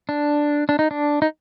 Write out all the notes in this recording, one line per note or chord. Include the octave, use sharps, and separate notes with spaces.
D4
D4
D#4
D4
D#4